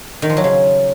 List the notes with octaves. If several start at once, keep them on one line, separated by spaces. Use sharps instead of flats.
D#3
F3
F#3
C#3